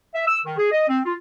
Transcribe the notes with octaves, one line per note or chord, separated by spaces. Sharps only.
E5
E6
D#3
G#4
D#5
C4
F4